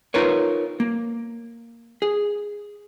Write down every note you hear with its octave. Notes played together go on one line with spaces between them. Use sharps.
D#4 F4 A#4 B4 C#5
A#3
G#4